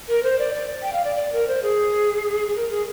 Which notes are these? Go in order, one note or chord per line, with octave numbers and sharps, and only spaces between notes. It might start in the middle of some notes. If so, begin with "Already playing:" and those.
A#4
C5
D5
D5
G5
F5
D5
D5
A#4
C5
G#4
G#4
A#4
G#4